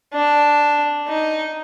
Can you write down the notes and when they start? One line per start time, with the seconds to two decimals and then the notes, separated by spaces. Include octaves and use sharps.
0.14 D4
1.08 D#4